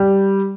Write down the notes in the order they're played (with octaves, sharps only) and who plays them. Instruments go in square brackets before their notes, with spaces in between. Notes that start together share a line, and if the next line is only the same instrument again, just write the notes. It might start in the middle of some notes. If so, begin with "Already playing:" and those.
Already playing: [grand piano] G3